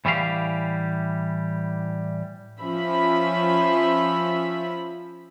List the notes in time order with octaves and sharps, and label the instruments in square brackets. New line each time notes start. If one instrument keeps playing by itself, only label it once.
[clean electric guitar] A2 E3 G3 G4 G#4 F5
[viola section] F3 C#4 E5 B5